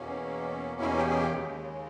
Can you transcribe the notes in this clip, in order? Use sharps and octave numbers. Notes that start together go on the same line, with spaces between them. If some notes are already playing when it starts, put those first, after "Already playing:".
Already playing: E2 B2 A#3 C#4
E4
G4
G#4
G4
D#2 C#3 G#3